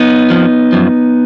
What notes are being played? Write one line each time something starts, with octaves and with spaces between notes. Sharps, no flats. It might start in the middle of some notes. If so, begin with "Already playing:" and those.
Already playing: B3 D#4
F2 F3
F#2 F3